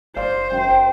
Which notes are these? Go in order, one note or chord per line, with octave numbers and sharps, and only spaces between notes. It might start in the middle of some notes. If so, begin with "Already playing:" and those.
F#1 C5 D5 F5
F#2 G5